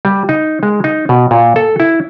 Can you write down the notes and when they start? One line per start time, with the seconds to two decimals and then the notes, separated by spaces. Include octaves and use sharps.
0.05 G3
0.29 D#4
0.63 G#3
0.84 D#4
1.09 B2
1.31 A#2
1.56 A4
1.80 E4